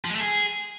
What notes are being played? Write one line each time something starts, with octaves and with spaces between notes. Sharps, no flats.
F3
G#3
A3
G#4